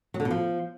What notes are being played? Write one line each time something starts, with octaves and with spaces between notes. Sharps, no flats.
F#3
D3
B2
F3